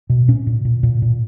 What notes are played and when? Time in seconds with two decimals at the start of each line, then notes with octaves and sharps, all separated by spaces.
0.10 B2
0.28 A#2 C#4
0.47 A#2
0.65 A#2
0.83 A#2
1.02 A#2